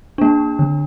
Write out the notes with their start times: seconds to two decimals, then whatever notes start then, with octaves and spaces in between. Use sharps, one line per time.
0.18 A#3 D4
0.59 D3